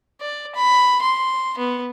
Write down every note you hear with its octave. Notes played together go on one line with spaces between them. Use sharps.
D5
B5
C6
B3